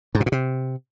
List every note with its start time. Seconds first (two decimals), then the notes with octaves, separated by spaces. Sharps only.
0.15 G#2
0.20 B2
0.26 A#2
0.32 C3